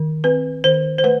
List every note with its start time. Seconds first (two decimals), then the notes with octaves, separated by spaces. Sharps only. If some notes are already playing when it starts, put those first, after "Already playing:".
Already playing: D#3
0.24 C4 B4
0.64 D#3 C5
0.99 C5
1.04 A3 B4